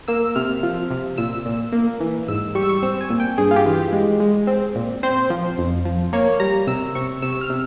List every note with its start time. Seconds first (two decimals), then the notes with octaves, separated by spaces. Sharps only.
0.08 A#3 E6
0.35 C3 F6
0.63 F3
0.91 C3
1.18 A#2 E6
1.46 A#2
1.73 A#3
2.00 E3
2.28 G#2 E6
2.55 G3 C#6
2.62 E6
2.69 C#6
2.82 C4 E6
3.01 G#5
3.10 A#2
3.20 G5
3.38 G2 G#4
3.51 F4
3.56 G4
3.65 E3
3.74 G4
3.92 G#3
4.20 G#3
4.47 C4
4.75 A#2
5.03 C4 C5
5.30 F3
5.58 F2
5.85 F3
6.13 A#3 C#5
6.40 G3 A#5
6.67 C3 E6
6.95 C3 C#6
7.22 C3 E6
7.32 E6
7.41 F6
7.50 C3